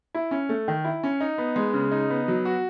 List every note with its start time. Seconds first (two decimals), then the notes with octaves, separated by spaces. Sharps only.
0.14 E4
0.31 C#4
0.49 A3
0.68 D#3
0.84 E4
1.03 C#4
1.20 D#4
1.38 B3
1.56 G#3
1.73 C#3
1.91 D#4
2.10 B3
2.28 F#3
2.45 F#4